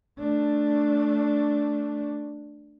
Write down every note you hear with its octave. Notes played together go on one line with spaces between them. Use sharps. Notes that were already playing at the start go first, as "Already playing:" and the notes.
A3 D4